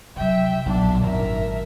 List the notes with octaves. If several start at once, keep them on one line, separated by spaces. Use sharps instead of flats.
C3 F#3 E5 G5
B1 A#2 F#3 D4
G#1 F#2 A#4 E5